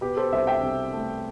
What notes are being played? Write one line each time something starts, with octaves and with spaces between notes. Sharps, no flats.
B2 G4 B4
A4 C5
C2 C5 E5
E5 G5
C2
A3